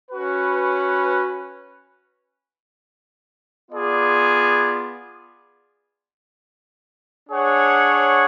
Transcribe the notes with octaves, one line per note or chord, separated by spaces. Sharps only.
C#4 F#4 B4
B3 F4 G#4 D5
D4 G#4 C#5 F#5